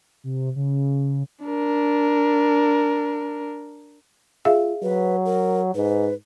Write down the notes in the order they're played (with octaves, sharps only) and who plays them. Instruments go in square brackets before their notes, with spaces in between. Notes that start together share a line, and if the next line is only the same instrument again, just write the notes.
[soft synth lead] C3
C#3
[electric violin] D4 A#4
[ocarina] F4 [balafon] G#4 E5 F5
[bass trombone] F#3 [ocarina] B4
[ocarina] A#4
[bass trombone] G#2 [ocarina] B4